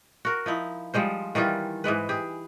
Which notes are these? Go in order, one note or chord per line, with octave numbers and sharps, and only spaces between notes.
F#4 A#4
F3 D#4 E4
F3 G3 G#3 C5
D#3 E3 G3 F4
G#2 E3 G#3 B4
G4 G#4